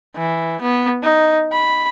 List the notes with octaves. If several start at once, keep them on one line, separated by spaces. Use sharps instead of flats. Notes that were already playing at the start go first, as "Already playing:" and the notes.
E3
B3
D#4
B5